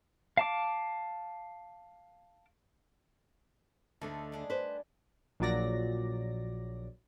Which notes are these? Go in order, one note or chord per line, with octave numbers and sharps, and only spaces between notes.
F5 A5 D6
D2 D3 A3 D#4
G3 D4 G#4
B4 C5
A#1 A#2 F#3 D5 A#6